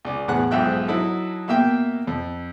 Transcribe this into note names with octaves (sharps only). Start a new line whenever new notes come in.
C#2 D5
E2 A2 B3 G#4 F#5 F#6
B1 G#2 F3 E5 G5 F#6
F#3 D#4 E4 A4
B2 A#3 E5 G5
F2